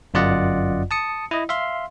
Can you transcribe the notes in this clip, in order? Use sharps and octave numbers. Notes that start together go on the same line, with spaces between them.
G1 F#2 F4 D5 D#5 F#5
A5 D#6 C#7
E4 D#5
E5 F5 C6